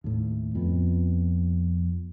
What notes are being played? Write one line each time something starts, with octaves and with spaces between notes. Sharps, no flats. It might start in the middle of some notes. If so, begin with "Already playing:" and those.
D#2 A2
F2 B3